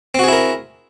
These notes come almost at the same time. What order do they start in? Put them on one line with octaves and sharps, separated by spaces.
C4 F#4 G#4 E4 A#4